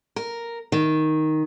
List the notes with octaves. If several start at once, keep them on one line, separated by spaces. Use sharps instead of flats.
A#4
D#3